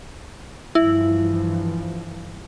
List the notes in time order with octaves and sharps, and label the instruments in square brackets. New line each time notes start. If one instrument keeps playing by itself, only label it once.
[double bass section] G2 E3 F3 [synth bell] E4